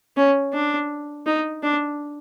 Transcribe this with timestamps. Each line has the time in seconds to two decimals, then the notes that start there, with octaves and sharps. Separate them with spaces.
0.17 C#4
0.53 D4
1.26 D#4
1.63 D4